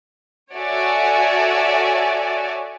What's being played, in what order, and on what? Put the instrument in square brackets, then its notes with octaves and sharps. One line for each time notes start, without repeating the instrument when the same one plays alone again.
[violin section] F#4 A4 C#5 D5 E5 G#5